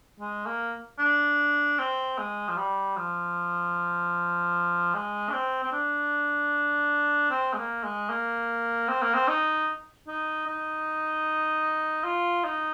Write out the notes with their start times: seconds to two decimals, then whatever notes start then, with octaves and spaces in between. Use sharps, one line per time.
0.20 G#3
0.46 A#3
0.99 D4
1.79 C4
2.18 G#3
2.49 F3
2.57 G3
2.97 F3
4.95 G#3
5.29 D4
5.34 C4
5.64 C4
5.73 D4
7.31 C4
7.53 G#3
7.58 A#3
7.84 G#3
8.09 A#3
8.89 C4
9.02 A#3
9.14 C4
9.28 D#4
10.08 D#4
10.47 D#4
12.04 F4
12.45 D#4